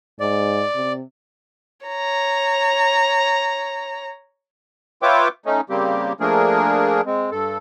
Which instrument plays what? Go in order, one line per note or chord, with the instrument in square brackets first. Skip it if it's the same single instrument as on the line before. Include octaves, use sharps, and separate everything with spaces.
[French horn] G#2 [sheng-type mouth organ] D5
[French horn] C3
[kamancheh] C#5 A#5
[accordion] F4 B4 C#5 E5 G5 D6
A3 C#4 D#4
C#3 G3 A#3 C4 G4
F3 A3 A#3 D4 G#4 A#4
G#3 C4
G2 A4